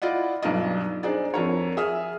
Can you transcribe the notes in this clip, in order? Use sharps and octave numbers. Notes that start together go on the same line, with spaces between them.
E4 F4 D5 D#5 F#5
B1 G2 D#4 F4 D5 D#5
D4 D#4 G#4 C5 D5
F2 A#4 C#5
G#4 E5 D#6 F6